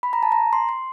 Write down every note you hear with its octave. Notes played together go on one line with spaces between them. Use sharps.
B5
A#5
A5
A#5
C6
C6